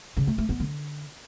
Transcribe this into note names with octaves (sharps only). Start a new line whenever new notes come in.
C#3
A3
A3
B3
D3